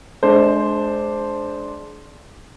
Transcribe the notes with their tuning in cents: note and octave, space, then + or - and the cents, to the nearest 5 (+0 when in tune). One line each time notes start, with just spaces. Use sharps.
G#3 +35 D4 +0 C5 +0